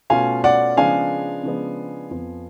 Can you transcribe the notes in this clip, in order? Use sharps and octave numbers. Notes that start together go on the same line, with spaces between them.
B2 A3 C#4 F4 F5 G#5
D5 F#5
C#3 F3 G#3 B3 D4 F5 G#5
C#3 F3 G#3 B3 D4
F2 F3 B3